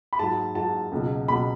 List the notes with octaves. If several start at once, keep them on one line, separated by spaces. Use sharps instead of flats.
B5
G#2 F#3 A5
G#2 F#3 A5
C#2 B2 F#3
C#2 B2 F#3 B5